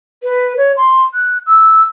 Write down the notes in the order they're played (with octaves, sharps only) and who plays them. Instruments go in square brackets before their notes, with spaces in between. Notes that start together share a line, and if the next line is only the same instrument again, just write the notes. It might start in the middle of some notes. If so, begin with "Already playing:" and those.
[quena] B4
C#5
C6
F#6
E6